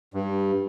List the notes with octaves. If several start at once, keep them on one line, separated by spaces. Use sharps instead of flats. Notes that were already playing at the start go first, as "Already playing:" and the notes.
G2